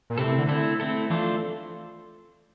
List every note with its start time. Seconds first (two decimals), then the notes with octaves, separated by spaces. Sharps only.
0.10 A#2
0.18 C3 A3 C4 E4 A4
0.28 C3
0.38 D3
0.49 A3 C4 E4 A4
0.80 A3 C4 E4 A4
1.10 E3 F3 A3 D4 A4 C5